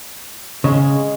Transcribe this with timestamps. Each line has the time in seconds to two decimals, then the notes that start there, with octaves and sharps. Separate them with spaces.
0.64 C#3 G#3